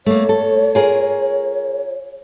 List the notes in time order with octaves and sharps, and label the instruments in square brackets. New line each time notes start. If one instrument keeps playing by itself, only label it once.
[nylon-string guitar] A3 A#3 [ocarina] C#5
[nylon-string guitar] A4
F4 G#4 A#4